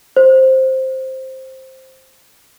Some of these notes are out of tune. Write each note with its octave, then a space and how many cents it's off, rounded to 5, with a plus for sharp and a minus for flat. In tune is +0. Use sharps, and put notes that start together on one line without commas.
C5 +5